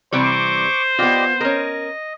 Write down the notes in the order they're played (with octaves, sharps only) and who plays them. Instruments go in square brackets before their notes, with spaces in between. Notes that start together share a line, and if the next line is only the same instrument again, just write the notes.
[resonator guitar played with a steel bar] C3 E3 G3 [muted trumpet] C5 [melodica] C#6 D6
[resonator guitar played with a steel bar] B3 F4 [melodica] G4 D5 D#5
[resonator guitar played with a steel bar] C#4 A#4 [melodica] D#5